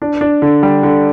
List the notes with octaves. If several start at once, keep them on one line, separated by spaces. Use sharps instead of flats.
D4
D4
D3
G3
D3